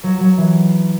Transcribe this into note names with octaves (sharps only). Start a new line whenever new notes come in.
F#3
F#3
E3